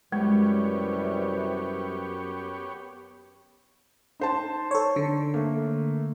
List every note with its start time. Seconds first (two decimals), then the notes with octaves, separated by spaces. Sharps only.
0.12 F#2 C3 E3 G3 G#3 B3 G4 C#5
4.20 D#4 C5 A5
4.71 A4 C#5
4.96 D3
5.34 A3 A#3